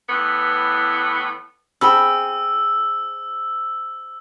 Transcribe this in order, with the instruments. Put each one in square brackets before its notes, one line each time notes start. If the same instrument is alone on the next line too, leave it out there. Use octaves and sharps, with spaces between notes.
[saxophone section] A2 E3 B3
[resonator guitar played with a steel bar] C4 G#4 [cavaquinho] G5 B5 [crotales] E6